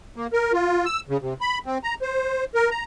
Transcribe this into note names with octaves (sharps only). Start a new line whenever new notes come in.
A#3
A#4
F4
E6
C#3
C3
B5
C4
A#5
C5
A#4
A#5